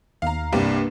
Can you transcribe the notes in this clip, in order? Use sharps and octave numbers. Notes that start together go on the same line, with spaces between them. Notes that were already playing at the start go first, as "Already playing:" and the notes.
D#2 F5 A#5
C2 G2 C3 A#3 D4 B4